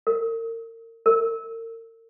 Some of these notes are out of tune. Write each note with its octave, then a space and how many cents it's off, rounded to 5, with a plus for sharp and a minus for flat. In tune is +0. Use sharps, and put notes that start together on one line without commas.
A#4 -35
A#4 -40